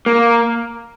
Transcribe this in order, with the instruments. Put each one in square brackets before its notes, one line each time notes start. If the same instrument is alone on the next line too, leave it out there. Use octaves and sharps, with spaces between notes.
[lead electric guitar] A#3